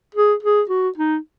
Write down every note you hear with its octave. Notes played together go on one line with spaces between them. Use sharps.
G#4
G#4
F#4
D#4